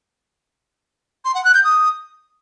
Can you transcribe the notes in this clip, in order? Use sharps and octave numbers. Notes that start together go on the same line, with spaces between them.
C6
F#5
F#6
G6
D#6